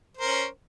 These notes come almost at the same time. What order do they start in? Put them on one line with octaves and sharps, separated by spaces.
C5 A#4 C#4